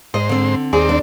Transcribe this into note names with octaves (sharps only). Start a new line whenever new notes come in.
G#2 C5 D#5
D3 C4
D#2 C4 G#4 D5
D4